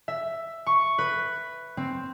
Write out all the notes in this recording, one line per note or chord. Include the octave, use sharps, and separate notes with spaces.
E5
C#6
B4
C4